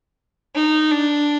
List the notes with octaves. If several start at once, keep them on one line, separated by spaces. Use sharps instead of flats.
D#4
D4